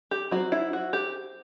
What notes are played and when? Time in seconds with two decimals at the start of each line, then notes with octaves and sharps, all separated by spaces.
0.11 G4
0.31 F#3 C4 F#4
0.52 E4
0.73 F#4
0.93 G4